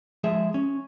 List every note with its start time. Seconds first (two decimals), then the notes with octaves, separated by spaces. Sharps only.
0.24 F3 G#3 G#4 E5
0.54 C#4